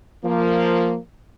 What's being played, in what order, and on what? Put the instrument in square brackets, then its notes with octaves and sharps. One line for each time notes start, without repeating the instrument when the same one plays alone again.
[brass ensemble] F3 A#3